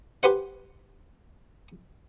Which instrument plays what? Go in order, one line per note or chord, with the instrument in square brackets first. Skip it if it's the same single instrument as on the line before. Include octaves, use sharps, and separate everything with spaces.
[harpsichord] G4 B4 C5 F#5